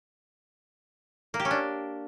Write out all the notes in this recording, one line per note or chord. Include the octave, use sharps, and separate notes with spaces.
A#3
G4
C#4
D4